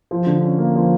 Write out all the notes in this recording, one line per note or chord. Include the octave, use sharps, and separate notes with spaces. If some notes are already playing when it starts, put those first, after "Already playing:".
F3
D3
C#4
A#3
F3